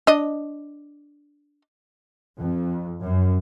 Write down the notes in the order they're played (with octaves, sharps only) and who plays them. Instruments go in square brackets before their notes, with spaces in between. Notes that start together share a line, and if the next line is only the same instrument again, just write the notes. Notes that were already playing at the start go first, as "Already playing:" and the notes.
[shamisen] D4 D#5
[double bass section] F2
F#2